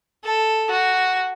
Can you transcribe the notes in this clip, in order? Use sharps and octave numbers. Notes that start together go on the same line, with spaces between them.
A4
F#4